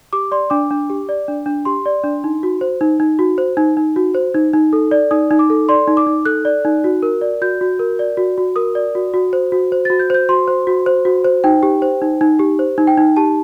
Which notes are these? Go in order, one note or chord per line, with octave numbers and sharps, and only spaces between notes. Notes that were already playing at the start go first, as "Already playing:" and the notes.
G4 D6
D5 C6
D4 D6
D4
G4
D5
D4
D4
G4 C6
D5
D4
D#4
F#4
C5
D#4
D#4
F#4
C5
D#4
D#4
F#4
C5
D#4
D#4
A4
D5
D#4 D#6
D#4
D6
A4
D5 C6
D#4
D6
D#4
A4 F#6
D5
D#4
F#4
A#4
D5
F#4 G6
F#4
A#4
D5
F#4
F#4
A#4 D#6
D5
F#4
F#4
C5
F#4
C5
F#4 A6
G6
C5 G6
F#4 C6
C5
F#4
C5
F#4
C5
D#4 G5
G4
C5
D#4
D#4
G4
C5
D#4
G5
D#4
G4 A5